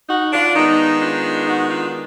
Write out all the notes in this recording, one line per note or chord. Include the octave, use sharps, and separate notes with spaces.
D#4 F#4
D4 F4
D#3 G#3 B3 D#4
D4 F4
D#4 F#4
D4 F4